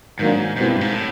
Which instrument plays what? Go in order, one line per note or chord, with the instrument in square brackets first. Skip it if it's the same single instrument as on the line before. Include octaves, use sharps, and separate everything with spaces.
[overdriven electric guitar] G#2 [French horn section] D#3 F#3 A#3 D4
[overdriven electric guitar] G#2 [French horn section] B2 G3 C4 E4
[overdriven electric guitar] G2
G#2
A2